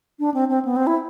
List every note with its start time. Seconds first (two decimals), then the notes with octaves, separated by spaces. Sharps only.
0.19 D4
0.34 C4
0.49 C4
0.65 B3
0.76 C4
0.87 E4